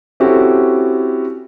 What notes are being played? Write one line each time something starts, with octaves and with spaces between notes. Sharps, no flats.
C4 C#4 E4 F#4 G4 A4